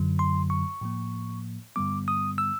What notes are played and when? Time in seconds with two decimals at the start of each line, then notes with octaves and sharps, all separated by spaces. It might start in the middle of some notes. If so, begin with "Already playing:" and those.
Already playing: F#2 D3 F#3
0.19 C6
0.50 C#6
0.81 A2 F3 A#3
1.76 G2 D3 G3 B3 D6
2.08 D#6
2.38 E6